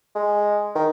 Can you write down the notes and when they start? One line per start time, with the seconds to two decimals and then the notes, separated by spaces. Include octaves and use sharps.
0.15 G#3
0.75 D#3